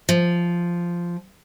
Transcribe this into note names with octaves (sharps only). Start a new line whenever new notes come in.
F3